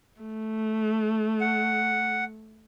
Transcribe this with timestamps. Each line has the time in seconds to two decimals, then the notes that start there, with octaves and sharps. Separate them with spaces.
0.21 A3
1.41 F#5